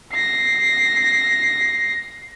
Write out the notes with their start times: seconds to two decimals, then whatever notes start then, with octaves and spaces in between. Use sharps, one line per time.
0.13 A#6 C7